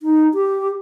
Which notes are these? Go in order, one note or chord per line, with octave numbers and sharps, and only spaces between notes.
D#4
G4